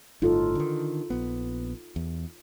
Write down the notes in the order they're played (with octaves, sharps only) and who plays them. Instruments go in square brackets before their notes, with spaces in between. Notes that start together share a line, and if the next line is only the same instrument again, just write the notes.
[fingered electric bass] G1 A2 [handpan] D#4 F4 A4
[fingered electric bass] D3 D#3
A#1 B3
E2